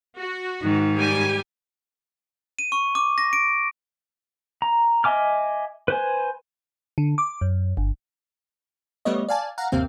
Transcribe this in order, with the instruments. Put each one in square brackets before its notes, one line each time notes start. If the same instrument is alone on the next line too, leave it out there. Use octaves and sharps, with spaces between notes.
[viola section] F#4
[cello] G#2 D#3
[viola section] G3 G4 G#5
[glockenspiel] D#7
C#6
D6
A#6
D7
[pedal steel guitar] A#5
D#5 E5 G#5 D6 F6
B4 C5 G#5
[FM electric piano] D3
D6
F#2
G1
[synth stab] G3 A3 B3 C#5 D#5
D5 F5 G#5 A5
F5 F#5 A#5
G1 D#2 C3 A#3 C4 F5